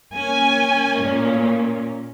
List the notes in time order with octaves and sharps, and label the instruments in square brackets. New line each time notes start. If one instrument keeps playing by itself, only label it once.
[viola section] A#3 C#4 [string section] G#5
[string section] A#2